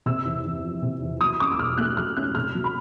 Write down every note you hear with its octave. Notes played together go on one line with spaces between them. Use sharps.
C3 E6
E2
E2
F3
C3
E2
F#3 D#6
C#4 D6
E6
B2 F6
A3 F#6
F#3 F6
C#4 F#6
C3 F6
F#3
B5